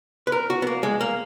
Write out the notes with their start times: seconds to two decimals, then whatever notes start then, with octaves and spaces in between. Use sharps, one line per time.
0.27 B4
0.32 A#4
0.50 F#4
0.62 B3
0.67 A#3
0.83 G#3
1.01 A#3